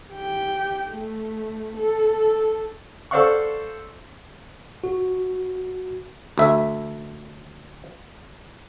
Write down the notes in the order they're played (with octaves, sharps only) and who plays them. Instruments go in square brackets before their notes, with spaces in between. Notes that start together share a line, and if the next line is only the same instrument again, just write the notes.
[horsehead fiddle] G4 G5
A3
A4
[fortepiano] A4 C5 D5 F5 F#5 C#6
[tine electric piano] F#4
[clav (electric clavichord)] D2 E5